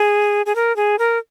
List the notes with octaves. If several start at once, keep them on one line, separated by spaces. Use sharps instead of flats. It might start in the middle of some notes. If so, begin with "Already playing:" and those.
Already playing: G#4
G#4
A#4
G#4
A#4